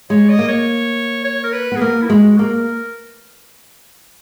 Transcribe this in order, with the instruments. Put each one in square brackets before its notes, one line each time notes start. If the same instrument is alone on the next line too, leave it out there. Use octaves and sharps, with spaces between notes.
[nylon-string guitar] G#3 [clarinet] C#5
[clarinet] D#5
[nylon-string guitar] A#3
[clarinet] C#5
C#5
A#4
B4
[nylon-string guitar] B3 [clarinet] G#4
[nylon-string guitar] A#3 [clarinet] A#4
[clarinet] E4
[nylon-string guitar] G#3 [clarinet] F#4
[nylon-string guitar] A#3 [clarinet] A#4